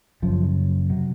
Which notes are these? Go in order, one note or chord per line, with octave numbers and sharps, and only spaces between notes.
F#1 F#2 C#3 F3
C3 F#3